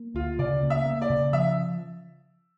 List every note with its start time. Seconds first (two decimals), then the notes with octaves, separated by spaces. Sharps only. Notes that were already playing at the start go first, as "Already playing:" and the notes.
Already playing: A#3
0.14 D2 F4
0.39 C#3 D5
0.62 A#3
0.70 E5
0.86 A#3
1.02 D5
1.10 C#3
1.33 F3 E5